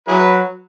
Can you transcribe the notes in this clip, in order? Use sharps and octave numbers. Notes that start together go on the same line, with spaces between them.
F#3 E4 G#4 B4